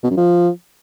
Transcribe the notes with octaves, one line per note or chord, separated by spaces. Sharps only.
B2
F#2
F3